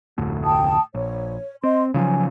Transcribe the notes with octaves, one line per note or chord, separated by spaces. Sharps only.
F1 D2 A2
G5 A5 D#6
A#1 C#5
C4 D#5 C6
C#3 F3 F#3 G#5